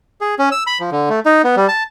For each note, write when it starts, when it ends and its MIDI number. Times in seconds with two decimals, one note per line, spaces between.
0.21 0.35 68
0.39 0.49 61
0.52 0.64 88
0.67 0.78 83
0.80 0.90 53
0.92 1.09 50
1.10 1.20 57
1.26 1.42 63
1.44 1.55 59
1.57 1.68 55
1.68 1.84 81